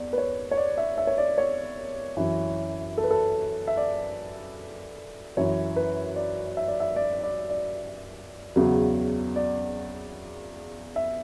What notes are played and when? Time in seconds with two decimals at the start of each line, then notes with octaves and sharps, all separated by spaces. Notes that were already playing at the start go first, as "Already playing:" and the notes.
Already playing: E2 D5
0.13 B4
0.18 C#5
0.51 C#5
0.57 D5
0.77 E5
0.98 E5
1.07 C#5
1.18 D5
1.38 C#5
2.17 F#2 E3
2.98 A4
3.03 B4
3.11 A4
3.67 E5
3.77 D5
5.37 F#2 E3 C#5
5.76 B4
6.16 D5
6.57 E5
6.68 D5
6.80 E5
6.96 D5
7.23 D5
7.50 D5
8.56 E2 C#3 F#3
9.36 D5
10.96 E5